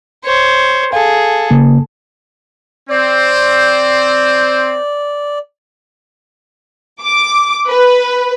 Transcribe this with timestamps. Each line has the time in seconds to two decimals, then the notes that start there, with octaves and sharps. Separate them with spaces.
0.24 C5 C#5
0.93 G#4 A4 F5
1.51 C#3 A#3
2.90 C4 C5 D5
7.01 D6
7.67 B4